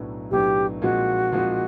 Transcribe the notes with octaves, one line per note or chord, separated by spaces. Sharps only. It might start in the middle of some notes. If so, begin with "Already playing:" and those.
Already playing: B1 A2 F#3 B3 D4
B1 A2 F#3 B3 D4 G4
A#2 F3 G#3 C4 D#4 F#4
A#2 F3 G#3 C4 D#4